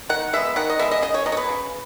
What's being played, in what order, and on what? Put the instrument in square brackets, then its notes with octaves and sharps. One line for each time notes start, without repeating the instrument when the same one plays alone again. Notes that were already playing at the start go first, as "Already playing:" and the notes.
[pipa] D#3 F#5
G#3 B3 E5
D#3 F#5
D#5
G#3 B3 E5
D#5
C#3 D#5
C#5
F#3 B3 D#5
C#5
B4
C#3